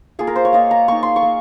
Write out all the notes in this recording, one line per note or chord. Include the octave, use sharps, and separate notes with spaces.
A#3 F4 G#4
A#4
C5
C#5
A#3 F4 D#5
A#5
A#3 D#4 C#6
C6
C#6
A#3